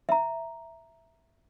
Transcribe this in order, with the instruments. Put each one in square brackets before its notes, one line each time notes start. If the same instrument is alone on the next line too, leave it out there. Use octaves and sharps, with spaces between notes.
[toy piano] E5 A#5